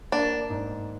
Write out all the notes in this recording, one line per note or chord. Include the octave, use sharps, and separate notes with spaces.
A#3 D4
G#2